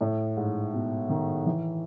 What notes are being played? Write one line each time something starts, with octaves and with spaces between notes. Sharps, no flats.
A2
G#2
B2
D#3
E3